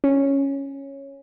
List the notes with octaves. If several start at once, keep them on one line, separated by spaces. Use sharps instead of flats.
C#4